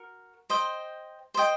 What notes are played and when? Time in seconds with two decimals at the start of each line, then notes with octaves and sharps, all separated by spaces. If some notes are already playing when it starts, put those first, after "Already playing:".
Already playing: F#4 A#4
0.50 C5 D#5 G5
1.34 C5 D#5 G5